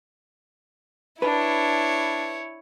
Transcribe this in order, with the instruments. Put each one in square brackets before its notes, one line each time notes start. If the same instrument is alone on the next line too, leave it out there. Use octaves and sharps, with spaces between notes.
[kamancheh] D4 [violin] E4 C#5 [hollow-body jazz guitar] B4